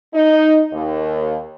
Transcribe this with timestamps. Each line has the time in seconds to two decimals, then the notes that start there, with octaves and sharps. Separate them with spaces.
0.14 D#4
0.72 D#2